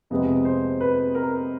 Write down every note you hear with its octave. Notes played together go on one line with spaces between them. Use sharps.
F2 C3 F3 G#3 B3 D#5
C5
B4
A#4